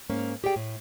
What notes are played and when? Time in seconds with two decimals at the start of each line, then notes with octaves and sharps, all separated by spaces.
0.10 G#2 A#3 C#4
0.44 G4 G#4 D5 G5
0.56 A2